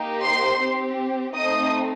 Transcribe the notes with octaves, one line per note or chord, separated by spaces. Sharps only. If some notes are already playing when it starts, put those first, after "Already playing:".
Already playing: A#3 D#4 G4
C5 C6
C4 G4
A3 C4 D#4 D#5 D#6